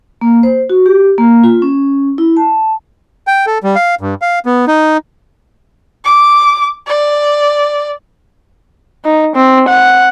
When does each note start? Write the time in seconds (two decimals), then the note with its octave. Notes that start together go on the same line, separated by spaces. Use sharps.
0.21 A#3
0.43 C5
0.70 F#4
0.86 G4
1.18 A#3
1.44 F4
1.62 C#4
2.18 E4
2.37 A5
3.27 G5
3.47 A4
3.64 G3
3.76 F5
4.01 G2
4.22 F5
4.46 B3
4.68 D#4
6.05 D6
6.87 D5
9.05 D#4
9.35 C4
9.68 F#5